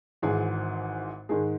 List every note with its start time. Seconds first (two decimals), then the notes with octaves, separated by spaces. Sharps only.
0.22 G#1 G#2 E3 G#4
1.29 G#2 D#3 G#3 G#4